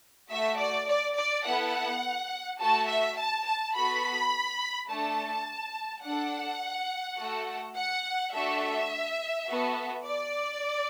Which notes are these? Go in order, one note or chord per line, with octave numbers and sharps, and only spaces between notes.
A3 F#4 A4 E5
D5
D5
D5
B3 E4 A4 F#5
A3 F#4 A4 A5
E5
A5
A5
B3 F#4 A4 B5
A3 D4 A4 A5
D4 A4 F#5
A3 F#4 A4
F#5
A3 D4 F#4 A4 E5
B3 F#4 A4
D5